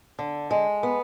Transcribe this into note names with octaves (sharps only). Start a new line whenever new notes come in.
D3
G#3
B3